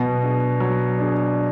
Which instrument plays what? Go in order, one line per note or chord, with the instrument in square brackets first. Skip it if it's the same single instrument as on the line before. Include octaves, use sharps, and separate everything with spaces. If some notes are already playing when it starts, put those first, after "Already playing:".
Already playing: [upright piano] B2 [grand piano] F#3
[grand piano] D4 G#4
F#3
D4 G#4